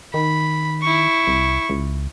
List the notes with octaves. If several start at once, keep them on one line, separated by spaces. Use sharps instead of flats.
D#3 B5
E4 C#6
C2
C#2